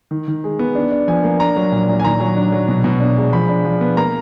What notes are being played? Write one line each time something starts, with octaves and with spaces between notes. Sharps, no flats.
D#3
D#3
G#3
B3
D4
D4
F3 G#5
A#3
D4 A#5
F#3
A#2
A#2
G#5
D#3 A#5
F#3
D4
F#3
B2
B2
D4
G#3
F3 B5
D4
F3
B3
A#3 A#5